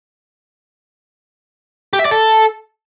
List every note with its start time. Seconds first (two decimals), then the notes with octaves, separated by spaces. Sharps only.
1.93 G4
1.99 E5
2.05 D5
2.11 A4